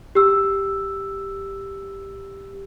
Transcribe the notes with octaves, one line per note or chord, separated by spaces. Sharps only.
G4 E6